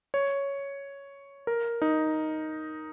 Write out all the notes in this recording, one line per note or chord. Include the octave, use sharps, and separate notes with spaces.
C#5
A#4
D#4